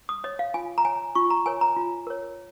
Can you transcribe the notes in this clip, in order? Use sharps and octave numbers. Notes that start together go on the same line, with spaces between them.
D#6
C#5 D#5
F5
F4 G#5
A#5
C#5 G#5
F4 C#6
A#5
A#4 C#5 G#5
A#5
F4
A#4 C#5